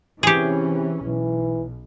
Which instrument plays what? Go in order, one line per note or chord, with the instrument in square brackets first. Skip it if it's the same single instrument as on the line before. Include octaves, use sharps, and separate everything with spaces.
[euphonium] C3 [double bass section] E3 C#4 [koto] G4 G#4
[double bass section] B1 [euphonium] E3